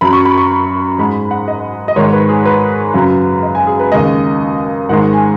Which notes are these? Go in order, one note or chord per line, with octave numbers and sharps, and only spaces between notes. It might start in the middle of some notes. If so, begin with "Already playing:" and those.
F#2 F#3 B5
C#6
B5
C#6
G#2 G#3 B5
F#5
D#5
D#5
G#2 D#3 G#3 C#5
B4
G#4
B4
F#2 C#3 F#3
D#5
G#5
G#4
B4
D#2 C#3 G#3 D#5
G#2 D#3 G#3 F#5
G#5